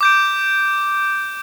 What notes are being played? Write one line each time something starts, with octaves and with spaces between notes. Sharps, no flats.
D6 G6 D7